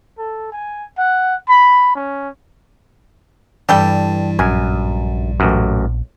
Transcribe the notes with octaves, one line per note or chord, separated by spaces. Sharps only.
A4
G#5
F#5
B5
C#4
G2 E3 G3 A4 G5 A5
A#1 F#2 G#5
A1 F#2